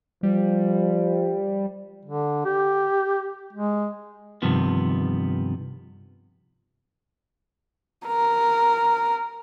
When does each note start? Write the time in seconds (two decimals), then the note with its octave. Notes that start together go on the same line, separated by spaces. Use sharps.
0.23 F3 G3
2.05 D3
2.45 G4
3.53 G#3
4.42 G2 C3 D#3 F3 B3
8.07 A#4